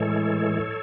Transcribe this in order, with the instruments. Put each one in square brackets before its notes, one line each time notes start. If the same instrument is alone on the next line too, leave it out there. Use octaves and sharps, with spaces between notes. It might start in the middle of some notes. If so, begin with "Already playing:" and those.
Already playing: [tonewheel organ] A2 E3 G#3 A4 C#5